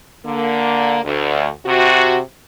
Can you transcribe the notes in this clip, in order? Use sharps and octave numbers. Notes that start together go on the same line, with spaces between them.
D3 A#3
D2
C3 F#4